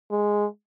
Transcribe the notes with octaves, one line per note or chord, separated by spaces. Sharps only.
G#3